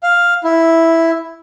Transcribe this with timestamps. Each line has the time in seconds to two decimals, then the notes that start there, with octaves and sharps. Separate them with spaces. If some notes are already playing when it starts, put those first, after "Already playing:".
0.03 F5
0.44 E4